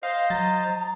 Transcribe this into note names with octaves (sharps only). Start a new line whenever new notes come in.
C5 D#5 F5
F#3 A#5 A6